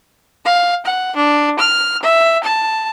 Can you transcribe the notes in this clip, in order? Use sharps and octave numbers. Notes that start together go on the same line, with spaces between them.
F5
F#5
D4
F6
E5
A5